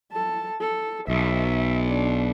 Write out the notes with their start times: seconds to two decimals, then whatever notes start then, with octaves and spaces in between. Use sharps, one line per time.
0.12 A4 A5
0.61 A4
1.08 B1 E5
1.87 D4